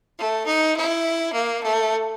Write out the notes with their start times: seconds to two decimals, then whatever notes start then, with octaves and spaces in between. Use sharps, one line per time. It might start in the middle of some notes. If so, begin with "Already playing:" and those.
0.17 A3
0.46 D#4
0.75 E4
1.32 A#3
1.61 A3